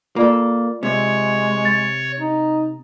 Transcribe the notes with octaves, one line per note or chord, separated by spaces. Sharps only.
A#3 F4 A4 D5
C3 G#3 C#5
A6
D#4